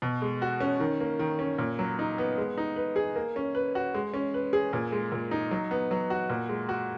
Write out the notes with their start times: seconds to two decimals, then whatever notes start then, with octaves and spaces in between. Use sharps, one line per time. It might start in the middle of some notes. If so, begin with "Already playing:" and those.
0.02 B2
0.22 G#3
0.42 F#4
0.60 C#4
0.80 D#3
1.00 A#3
1.19 D#3
1.39 C#4
1.58 A#2
1.79 F#3
1.99 D#4
2.18 B3
2.38 G#3
2.58 D#4
2.76 B4
2.96 G#4
3.16 A#3
3.36 C#4
3.55 B4
3.75 F#4
3.94 G#3
4.14 C#4
4.34 B4
4.53 G#4
4.73 A#2
4.92 G#3
5.12 A#2
5.31 D#4
5.51 F#3
5.71 B3
5.91 F#3
6.10 F#4
6.30 A#2
6.49 G#3
6.69 F#4